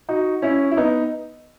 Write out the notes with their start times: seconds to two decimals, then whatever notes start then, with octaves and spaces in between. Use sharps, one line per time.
0.09 D#4 F#4
0.42 C#4 E4
0.72 E4
0.77 B3 D#4